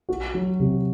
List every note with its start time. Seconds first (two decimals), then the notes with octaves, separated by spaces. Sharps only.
0.09 F#4
0.34 F#3
0.60 C3